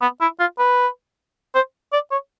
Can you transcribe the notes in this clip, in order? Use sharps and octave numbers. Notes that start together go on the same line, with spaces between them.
B3
E4
F4
B4
C5
D5
C#5